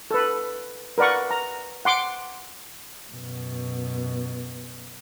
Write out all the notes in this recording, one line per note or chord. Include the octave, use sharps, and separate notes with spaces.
A4 B4
A#4 B4 D5 F#5 C#6
A#5
F#5 C6 D6
F#2 B2